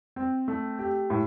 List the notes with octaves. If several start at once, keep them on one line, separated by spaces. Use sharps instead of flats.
C4
A3
G4
A2